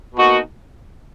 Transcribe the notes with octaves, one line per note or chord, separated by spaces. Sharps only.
B2 A#3 D#4 F#4